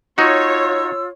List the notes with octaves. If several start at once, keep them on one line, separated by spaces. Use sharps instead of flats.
D#4 F4 F#4 C#5 E6